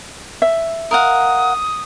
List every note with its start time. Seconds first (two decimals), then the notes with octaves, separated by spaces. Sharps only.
0.42 E5
0.91 A#4 F5 F#5 D#6